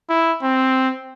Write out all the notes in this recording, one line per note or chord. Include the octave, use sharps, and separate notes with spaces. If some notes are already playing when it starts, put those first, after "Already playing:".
E4
C4